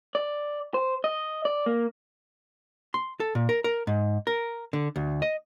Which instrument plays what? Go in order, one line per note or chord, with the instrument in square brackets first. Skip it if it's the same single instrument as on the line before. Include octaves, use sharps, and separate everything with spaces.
[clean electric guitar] D5
C5
D#5
D5
A#3
[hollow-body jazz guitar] C6
A4
A#2
A#4
A#4
G#2
A#4
D3
D2
D#5